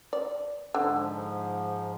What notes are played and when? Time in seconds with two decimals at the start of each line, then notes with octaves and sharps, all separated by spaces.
0.13 D5
0.74 G#2 D3 F3